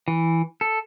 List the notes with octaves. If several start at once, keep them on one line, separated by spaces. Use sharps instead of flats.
E3
A4